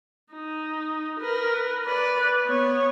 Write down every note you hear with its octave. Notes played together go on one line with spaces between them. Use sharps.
D#4
A#4 B4
B4 D5
B3 C#5